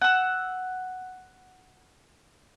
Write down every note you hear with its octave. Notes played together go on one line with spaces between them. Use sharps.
F#5 E6